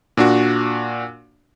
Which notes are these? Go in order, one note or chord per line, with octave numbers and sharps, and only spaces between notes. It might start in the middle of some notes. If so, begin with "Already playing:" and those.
A#2 D4 F#4